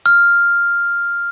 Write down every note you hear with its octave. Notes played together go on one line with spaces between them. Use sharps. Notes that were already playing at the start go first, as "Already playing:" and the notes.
F6